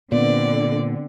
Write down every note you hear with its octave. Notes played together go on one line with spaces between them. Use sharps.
A#2 D3 B3 C4 D5